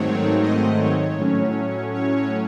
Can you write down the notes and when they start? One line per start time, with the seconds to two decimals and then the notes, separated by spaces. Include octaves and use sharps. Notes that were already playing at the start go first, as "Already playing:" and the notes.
Already playing: G#2 D#3 F#3 A3 C4 C#5
0.43 D#5
0.81 C#5
1.18 A2 F#3 C#4
1.94 C#5